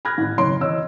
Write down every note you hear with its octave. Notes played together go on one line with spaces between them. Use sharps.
B5 F6 F#6 G#6 A#6
A1
F#1 C#5 C6 D7
E3 C#5 D#5 E6